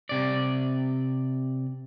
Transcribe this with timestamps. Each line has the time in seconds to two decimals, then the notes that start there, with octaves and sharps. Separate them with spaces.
0.09 C3 D5